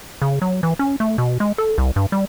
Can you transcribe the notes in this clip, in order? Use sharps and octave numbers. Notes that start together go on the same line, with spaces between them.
C#3
F#3
E3
C#4
A3
B2
G#3
A4
C2
G2
G3